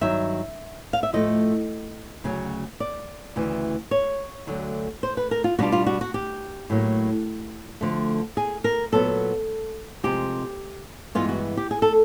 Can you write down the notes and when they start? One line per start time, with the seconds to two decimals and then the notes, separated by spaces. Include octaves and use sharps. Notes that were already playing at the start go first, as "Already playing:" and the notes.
0.01 G2 D#3 F#3 E5
0.93 F5
1.03 E5
1.13 A2 F3 A3 D#5
2.24 D2 C#3 F#3
2.80 D5
3.36 D2 C#3 E3
3.91 C#5
4.47 D2 D3 F#3 A3
5.03 C5
5.17 B4
5.31 A#4
5.44 F4
5.59 B2 G3 B3 D4 F4 F#4
5.72 F4
5.87 F#4
6.01 F#4
6.14 G4
6.70 A2 F#3 A#3
7.81 D2 D3 F3 A3
8.37 G#4
8.64 A#4
8.92 A#2 F#3 B3 A4
10.03 C3 F3 G#3 G4
11.15 G2 E3 G#3 B3 F4
11.29 F#4
11.57 G4
11.71 G#4
11.82 A4